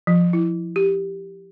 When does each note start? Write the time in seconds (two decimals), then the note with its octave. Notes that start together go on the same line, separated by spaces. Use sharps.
0.07 F3
0.33 E4
0.76 G4